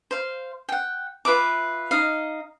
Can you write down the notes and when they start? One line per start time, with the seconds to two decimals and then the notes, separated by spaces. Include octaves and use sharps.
0.11 C5 F5
0.69 F#5 G5
1.25 F4 B4 E5 D6
1.91 D#4 D#5 F5